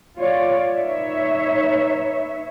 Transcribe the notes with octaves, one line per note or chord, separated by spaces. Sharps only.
F4 C#5 D5
D#4 B4 C#5 E5